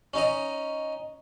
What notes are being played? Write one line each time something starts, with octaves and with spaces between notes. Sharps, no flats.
C#4 D#4 D#5